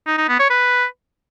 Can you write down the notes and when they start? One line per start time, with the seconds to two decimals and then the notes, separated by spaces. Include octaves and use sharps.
0.07 D#4
0.18 D#4
0.29 B3
0.39 C#5
0.50 B4